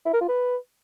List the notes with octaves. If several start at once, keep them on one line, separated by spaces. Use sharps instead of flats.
E4
A#4
F4
B4